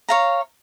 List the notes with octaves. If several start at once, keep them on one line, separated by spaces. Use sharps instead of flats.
C#5 F5 A#5